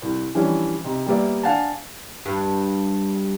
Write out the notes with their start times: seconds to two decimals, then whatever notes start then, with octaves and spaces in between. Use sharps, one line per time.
0.02 C2
0.35 E3 F3 G3 C#4 D4 E4
0.84 C3 D#4
1.06 G3 A#3 B3 D5 E5
1.43 D4 D5 F5 F#5 G#5 A5
2.26 G2